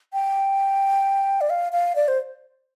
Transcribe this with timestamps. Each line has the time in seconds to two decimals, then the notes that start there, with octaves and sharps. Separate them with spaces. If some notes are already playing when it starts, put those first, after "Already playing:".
0.13 G5
1.41 D5
1.50 F5
1.72 F5
1.95 D5
2.08 C5